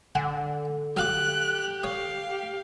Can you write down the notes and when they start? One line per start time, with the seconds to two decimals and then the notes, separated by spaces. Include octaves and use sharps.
0.15 D3 F#5 G#5
0.97 F#3 G4 F5 D6 F#6
1.83 C#5 F5 D#6
2.31 G4